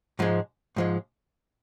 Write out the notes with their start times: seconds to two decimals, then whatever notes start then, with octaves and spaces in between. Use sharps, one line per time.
0.19 G#2 F3 G#3
0.76 G#2 F3 G#3